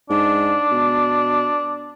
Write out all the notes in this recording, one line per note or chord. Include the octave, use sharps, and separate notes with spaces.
G#2 D4
B2